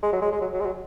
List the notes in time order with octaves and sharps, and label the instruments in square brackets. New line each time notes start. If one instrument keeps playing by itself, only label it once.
[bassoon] G#3
F#3
G#3
G#3
F#3
F#3
G#3
F#3